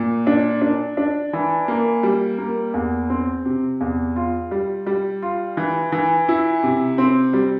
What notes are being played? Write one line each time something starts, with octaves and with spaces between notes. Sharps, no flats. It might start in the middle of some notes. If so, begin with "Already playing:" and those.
Already playing: A#2
D4
D4
D4
E3
A#3
G3
A#3
E2
C4
C3
E2
F4
G3
G3
F4
E3
E3
E4
C3
C4
G3